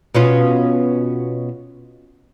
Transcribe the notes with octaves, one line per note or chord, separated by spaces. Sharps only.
B2 C#4 F4